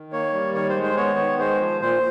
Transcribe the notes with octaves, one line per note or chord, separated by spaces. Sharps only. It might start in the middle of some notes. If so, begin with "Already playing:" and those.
Already playing: D#3
A#3 C#5
G3
D#3 C#5
C5
G#3
C5
B3 C#5
D#3
G#3 C5
F3
A#2 C5